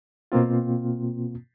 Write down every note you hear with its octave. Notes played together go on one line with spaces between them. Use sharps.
B2 A#3 C4 F4